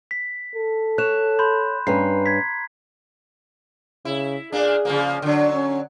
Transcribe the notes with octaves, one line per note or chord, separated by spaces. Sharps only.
B6
A4
C#5 F#6 E7
B5 C6 G6
G2 C#4 B4 A#5 C7
G#6 B6
C#3 E4
A#2 A#3 D4 G#4
C#3 F3 A#3
D3 F#3 D4
C#4